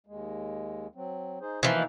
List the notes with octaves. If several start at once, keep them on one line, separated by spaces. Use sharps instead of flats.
D#2 G#3
F#3 C4
D#4 G#4 C5
B2 E3 F3 A#3 D#4